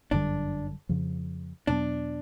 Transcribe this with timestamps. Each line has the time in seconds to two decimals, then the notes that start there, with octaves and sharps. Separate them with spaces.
0.11 G1 F#2 D3 G3 D4
0.89 F2 C#3 F3
1.67 E2 B2 F#3 B3 D4